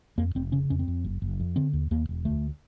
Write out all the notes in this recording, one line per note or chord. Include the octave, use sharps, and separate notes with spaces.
F2 A#3
F1 C4
C#3 C#4
F2 C#4
C4
F2
F#1
F#1
F2
D3 C4
D#2
D#2 A#3
E1
D2 A3